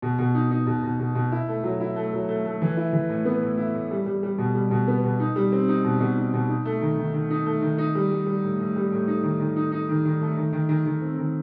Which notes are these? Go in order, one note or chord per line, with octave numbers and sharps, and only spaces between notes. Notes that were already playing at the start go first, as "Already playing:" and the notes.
B2
B2
D#4
D#4
B2
B2
B2
B2
E4
A3
F#3
E4
A3
F#3
A3
A3
E3
E4
E3
A2
B3
A2
E4
A2
G3
G3
G3
B2
G3
B2
B3
B2
D#4
G3
C4
D#4
B2
B2
D#4
B2
D#4
A3
D#3
D#3
D#3
D#4
A3
D#3
D#4
G3
G3
G3
A2
A2
G3
A2
D#4
D#3
D#3
D#4
D#4
D#3
D#3
A3
D#3
D#3
D#3
D#3
C4
D#3